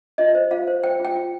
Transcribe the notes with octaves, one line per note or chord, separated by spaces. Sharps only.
F4 D#5
C5
F4 F5
C5
C5 G5
F4 G5
F4